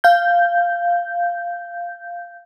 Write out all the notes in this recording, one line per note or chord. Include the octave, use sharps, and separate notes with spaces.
F5 G6